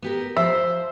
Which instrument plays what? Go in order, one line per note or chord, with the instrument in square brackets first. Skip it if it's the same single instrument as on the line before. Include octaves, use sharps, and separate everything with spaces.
[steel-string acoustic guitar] B3 G4 A#4
[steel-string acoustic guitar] F3 C5 [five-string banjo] E5